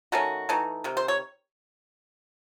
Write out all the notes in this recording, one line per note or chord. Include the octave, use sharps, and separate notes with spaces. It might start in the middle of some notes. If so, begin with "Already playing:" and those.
D#3 A3 C#4 F#4
E3 A3 D#4
C3 D#3
C5
C#5